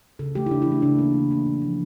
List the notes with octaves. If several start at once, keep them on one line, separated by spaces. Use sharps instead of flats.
C#3 A4
E3 A3 G4
E4
C#3 D4
E4
E3 A3
C#3 D4
E3 A#3
C#3
E3 A#3
A#2
F3 A3